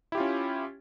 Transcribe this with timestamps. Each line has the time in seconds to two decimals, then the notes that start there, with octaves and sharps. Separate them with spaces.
0.12 E4
0.15 G4
0.18 F4
0.20 C#4